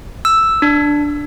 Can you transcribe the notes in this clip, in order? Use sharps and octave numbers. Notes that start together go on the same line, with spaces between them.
E6
D4